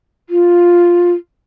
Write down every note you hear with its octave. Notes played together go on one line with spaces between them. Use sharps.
F4